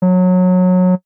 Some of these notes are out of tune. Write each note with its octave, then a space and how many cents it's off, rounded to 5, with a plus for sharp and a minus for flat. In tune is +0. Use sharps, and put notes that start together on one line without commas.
F#3 -20